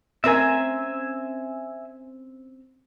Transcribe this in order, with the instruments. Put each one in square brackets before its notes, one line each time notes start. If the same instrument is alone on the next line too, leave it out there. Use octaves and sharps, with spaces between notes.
[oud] C4 C#4 A#4 [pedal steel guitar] E5 G#5